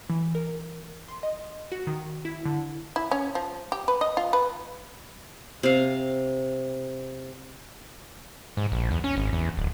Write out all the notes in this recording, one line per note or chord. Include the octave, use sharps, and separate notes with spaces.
E3
A#4
C6
D#5
F#4
D#3
E4
D3
E4
C#4
F3
G4
B4
D#5
F4
B4
C3 F5
G#2
A#1
E2
C#4
G#1
E2
D1